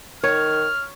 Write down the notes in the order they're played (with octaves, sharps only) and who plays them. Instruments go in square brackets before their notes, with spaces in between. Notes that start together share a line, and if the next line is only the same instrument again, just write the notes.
[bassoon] D#3 [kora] C#5 [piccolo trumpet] F6